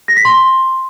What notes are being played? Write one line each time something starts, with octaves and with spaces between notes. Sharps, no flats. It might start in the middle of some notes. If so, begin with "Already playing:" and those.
A#6
B6
C6